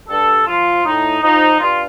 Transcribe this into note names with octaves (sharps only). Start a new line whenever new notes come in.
G2 A4
F3 F4
A2 D#4
F3 D#4
G2 F4